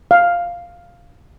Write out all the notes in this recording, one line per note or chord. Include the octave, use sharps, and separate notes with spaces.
F5